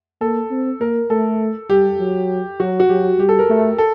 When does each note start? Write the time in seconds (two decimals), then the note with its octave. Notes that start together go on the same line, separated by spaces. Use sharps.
0.21 A#3 A4
0.51 C4
0.80 A#3 A#4
1.10 A3 A4
1.70 G3 G4
2.00 F#3
2.60 F#3 F#4
2.80 F#4
2.89 F#3 G4
3.19 G3 G4
3.29 A4
3.39 A#4
3.49 A3
3.78 A4